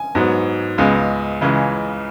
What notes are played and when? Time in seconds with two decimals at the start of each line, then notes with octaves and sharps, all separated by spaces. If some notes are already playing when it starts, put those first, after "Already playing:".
Already playing: G#5
0.15 G#2 F#3 B3
0.78 C#2 C#3 G#3 B3
1.41 C#2 C#3 E3 G#3